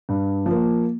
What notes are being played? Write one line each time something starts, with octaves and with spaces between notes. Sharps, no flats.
G2
F3
A#3